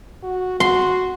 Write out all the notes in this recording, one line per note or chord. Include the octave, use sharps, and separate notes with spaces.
F#4
F#4 C6